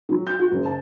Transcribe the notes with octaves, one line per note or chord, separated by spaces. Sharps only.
F#3
G6
F#4
F#1
A5